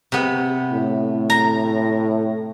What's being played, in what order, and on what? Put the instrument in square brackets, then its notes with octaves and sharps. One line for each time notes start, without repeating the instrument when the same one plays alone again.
[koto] C3 B3
[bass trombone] A2
[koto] A#5